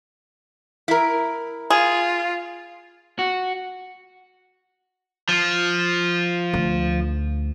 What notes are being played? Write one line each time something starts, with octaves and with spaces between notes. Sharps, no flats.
E4 A#4
F4 G#4
F#4
F3
D2